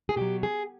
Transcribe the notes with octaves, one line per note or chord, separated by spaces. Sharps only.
G#4
B2 F#3 G4
G#4